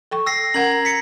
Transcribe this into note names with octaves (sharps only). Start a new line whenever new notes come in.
A4 G5 C#6
G5 E6 A#6 C7
C#4 A#4 F#5 A#5 G#6 F#7
B6 C#7